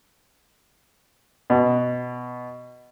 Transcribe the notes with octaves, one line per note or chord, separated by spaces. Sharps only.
B2